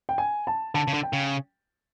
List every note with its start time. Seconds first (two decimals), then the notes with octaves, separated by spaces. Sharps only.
0.09 G5
0.18 G#5
0.47 A5
0.74 D3 A5
0.88 C#3
0.94 D3
1.03 G5
1.13 C#3